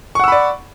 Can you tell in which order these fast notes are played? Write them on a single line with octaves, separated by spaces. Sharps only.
C#6 F#5 E6 B5 D5